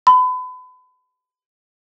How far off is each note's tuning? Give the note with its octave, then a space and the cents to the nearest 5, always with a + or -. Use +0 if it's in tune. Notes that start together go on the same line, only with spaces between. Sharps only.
B5 +35